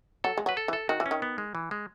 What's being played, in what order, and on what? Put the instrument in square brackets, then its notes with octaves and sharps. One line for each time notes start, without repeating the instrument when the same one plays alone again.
[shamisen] F#3 [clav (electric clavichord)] A4
[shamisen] G#3
F#3
[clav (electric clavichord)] B4
A4
[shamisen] E3
[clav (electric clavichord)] A4
[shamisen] D#3 [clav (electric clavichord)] F#4
[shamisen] E3
[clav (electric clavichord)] C#4
[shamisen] D#3
[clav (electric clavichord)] B3
G#3
E3
G#3